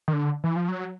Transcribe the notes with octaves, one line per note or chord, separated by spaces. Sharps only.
D#3
D3
E3
F3
F#3